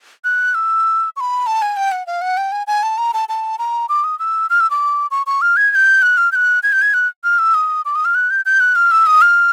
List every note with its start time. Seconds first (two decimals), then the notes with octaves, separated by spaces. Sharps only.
0.24 F#6
0.55 E6
1.16 C#6
1.20 B5
1.47 A5
1.62 G#5
1.77 G5
1.92 F#5
2.07 F5
2.22 F#5
2.37 G5
2.52 G#5
2.67 G#5
2.83 A5
2.98 A#5
3.14 A5
3.29 A5
3.59 A#5
3.89 D6
4.04 D#6
4.19 E6
4.50 F6
4.60 E6
4.70 D6
5.11 C#6
5.27 C#6
5.42 F6
5.57 G#6
5.72 G#6
5.75 G6
6.02 F#6
6.17 F6
6.32 G6
6.35 F#6
6.63 G#6
6.73 G6
6.82 G#6
6.94 F#6
7.24 F6
7.39 E6
7.54 D#6
7.85 D6
7.95 D#6
8.05 F6
8.15 F#6
8.30 G6
8.46 G6
8.60 F#6
8.76 F6
8.91 E6
9.07 D#6
9.22 F6